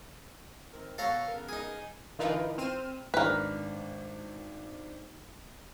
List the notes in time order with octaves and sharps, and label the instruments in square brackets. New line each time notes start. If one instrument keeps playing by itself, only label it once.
[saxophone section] D#3 C4 A#4
[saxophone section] B2 F#4 C#5 [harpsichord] A4 F5 A#5
[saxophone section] C#3 B3 A#4
[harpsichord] D#4 G#4
[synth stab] D3 E3 D#4 F4 A#4 B4
C4 F6 D#7 E7
[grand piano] G#1 D4 [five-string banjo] A#4 B4